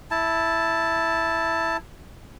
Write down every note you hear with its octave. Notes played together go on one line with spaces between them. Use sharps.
E4 A5